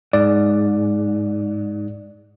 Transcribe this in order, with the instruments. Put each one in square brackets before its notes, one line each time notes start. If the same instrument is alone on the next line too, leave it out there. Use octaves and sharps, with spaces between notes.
[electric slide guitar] G#2 [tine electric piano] D5